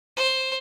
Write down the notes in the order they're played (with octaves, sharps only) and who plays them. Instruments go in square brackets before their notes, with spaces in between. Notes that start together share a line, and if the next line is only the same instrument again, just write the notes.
[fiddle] C5